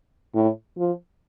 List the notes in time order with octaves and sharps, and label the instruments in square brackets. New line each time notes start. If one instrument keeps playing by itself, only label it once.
[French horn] A2
F3